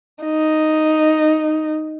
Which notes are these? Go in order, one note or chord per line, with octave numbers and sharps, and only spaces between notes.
D#4